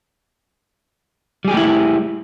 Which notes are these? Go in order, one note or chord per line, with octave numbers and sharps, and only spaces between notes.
G3 A3 E4 G4 G#4